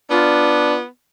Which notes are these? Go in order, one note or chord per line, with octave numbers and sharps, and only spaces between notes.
B3 D4 F4